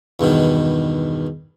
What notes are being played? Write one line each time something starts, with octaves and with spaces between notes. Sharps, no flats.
E2 G2 B2 D#3